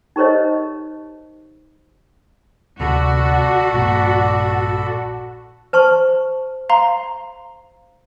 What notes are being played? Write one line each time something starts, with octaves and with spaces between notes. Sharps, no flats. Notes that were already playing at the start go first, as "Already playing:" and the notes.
D#4 G4 A#4 C5 C#5 D#5
D2 C3 F#4 A4 D5 B5
A#1 G2 A#2
C5 A5 C#6 F6
F5 A#5 C6